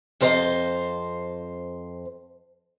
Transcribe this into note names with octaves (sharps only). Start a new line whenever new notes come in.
F2 F4 C5 D#5 G#5 A#5